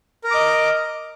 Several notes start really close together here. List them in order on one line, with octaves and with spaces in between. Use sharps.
A#4 A#5 D6 D#5